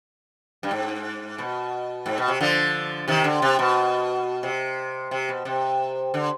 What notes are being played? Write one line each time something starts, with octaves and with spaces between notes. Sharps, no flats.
G2
G#2
B2
G#2
B2
C3
D3 F3
C3 D#3
D3
C3
B2
C3
C3
B2
C3
D3